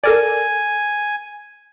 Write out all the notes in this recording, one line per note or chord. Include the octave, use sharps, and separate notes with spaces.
A4 A#4 D5 G#5